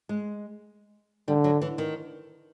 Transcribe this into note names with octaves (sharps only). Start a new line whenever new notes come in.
G#3
D3 G3
F#3
E3
D#3